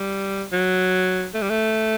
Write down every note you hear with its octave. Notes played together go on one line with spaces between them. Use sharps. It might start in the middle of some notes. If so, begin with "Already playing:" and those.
Already playing: G3
F#3
A3
G3
A3